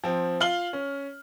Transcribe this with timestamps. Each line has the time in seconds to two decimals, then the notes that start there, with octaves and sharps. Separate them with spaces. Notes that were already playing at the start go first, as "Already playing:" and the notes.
0.04 F3 C4
0.40 F4 F5 F6 F#7 G7
0.73 C#4